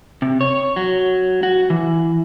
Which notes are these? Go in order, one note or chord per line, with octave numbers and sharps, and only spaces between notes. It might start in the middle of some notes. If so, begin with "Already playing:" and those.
C3
C#5
F#3
F#4
E3